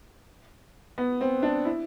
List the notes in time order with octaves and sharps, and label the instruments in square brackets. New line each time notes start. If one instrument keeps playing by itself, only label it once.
[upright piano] B3
C4
D4
E4